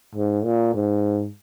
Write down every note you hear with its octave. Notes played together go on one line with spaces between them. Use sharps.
G#2
A#2
G#2